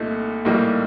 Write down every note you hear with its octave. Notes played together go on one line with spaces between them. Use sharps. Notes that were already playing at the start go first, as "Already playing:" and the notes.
Already playing: C2 A#2 A3 D#4
A#1 A2 G3 A#3 D#4